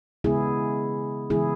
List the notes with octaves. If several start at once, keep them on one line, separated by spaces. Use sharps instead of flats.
C#3 G#3 B3 E4 G#4
C#3 E3 G#3 B3 E4 G#4